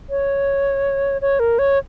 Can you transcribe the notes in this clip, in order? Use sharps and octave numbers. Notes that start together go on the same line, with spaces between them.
C#5
C#5
A#4
C#5